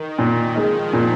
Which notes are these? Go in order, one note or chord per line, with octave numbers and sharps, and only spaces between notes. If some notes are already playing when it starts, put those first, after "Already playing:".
Already playing: D#3
A#2 D#3
F3 G#3 D#4
A#2